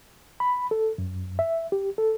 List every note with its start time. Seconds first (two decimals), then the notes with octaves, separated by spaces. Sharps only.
0.40 B5
0.71 A4
0.98 F#2
1.39 E5
1.72 G4
1.98 A4